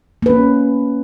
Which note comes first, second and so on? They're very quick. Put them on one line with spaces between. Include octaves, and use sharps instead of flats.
A#3 B4 C#4